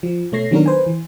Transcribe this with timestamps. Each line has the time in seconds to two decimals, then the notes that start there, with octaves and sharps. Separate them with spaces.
0.03 F3
0.32 B2 A3 C#5 A#6 C7
0.51 D#3 F#3 B3 D4 F#4 A#4
0.66 B4 C5 G#5
0.86 E3